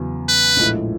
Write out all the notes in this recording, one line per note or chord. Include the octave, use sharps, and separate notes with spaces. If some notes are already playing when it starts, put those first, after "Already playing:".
Already playing: E2 C#3 F#3
B4
A#1 A2 F3 G#3